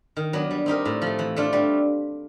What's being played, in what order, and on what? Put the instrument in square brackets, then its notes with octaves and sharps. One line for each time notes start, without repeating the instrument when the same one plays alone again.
[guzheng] D#3
F#3 B3 D4
G3
C4 D#4 G4 A#4
A2
F3 A3
E3
A3 D4 F4
G3